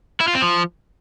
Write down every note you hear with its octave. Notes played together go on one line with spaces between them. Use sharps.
E4
F4
C4
F3